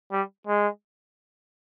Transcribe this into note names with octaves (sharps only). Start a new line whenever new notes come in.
G3
G#3